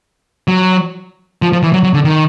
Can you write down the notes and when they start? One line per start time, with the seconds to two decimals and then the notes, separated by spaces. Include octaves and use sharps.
0.48 F#3
1.42 F3
1.53 F3
1.63 E3
1.73 F#3
1.83 F#3
1.94 D3
2.04 D#3